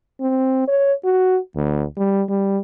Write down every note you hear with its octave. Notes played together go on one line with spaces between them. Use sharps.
C4
C#5
F#4
D2
G3
G3